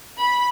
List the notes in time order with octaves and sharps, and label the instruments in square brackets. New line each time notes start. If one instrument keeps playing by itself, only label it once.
[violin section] B5